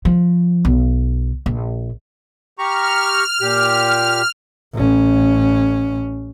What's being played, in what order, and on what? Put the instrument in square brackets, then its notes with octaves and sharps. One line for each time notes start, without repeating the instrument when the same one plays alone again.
[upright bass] F3
B1
A#1
[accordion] G4 A#5 C#6 [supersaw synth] F6
[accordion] A#2 G4
[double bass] A1 C#4